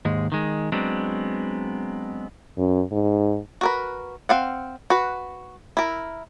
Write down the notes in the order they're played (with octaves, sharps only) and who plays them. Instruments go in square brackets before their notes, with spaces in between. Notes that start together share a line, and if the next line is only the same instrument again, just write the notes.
[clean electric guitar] D#2 G#2 G#3
D#3 G#3
F#3 G#3 B3 C4 D4
[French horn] F#2
G#2
[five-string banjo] F#4 A#4 B4
C4 F5 F#5
F#4 B4
E4 A#4